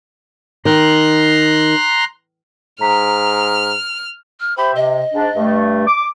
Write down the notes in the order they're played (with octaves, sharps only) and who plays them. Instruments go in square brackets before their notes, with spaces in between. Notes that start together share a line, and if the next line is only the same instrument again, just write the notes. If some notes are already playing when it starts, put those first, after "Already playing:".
[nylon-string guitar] D#3 [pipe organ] A#5 C6 F#6
[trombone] G#2 [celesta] A#5 B6 [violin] F6
[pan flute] F6
[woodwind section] G4 C5 E5 [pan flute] B5
[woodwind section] C3 [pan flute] D#5
[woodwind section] G#2 D4
G2 A3
D6